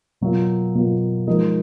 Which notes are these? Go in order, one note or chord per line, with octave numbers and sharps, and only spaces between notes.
B2 F#3 A#3 F4
B2 F#3 A#3 F4
F3 G#3 D#4 A#4 D#5